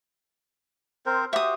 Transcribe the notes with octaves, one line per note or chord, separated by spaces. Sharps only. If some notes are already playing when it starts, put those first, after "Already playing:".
C4 A#4 C5
F#4 G4 C5 E5 D#6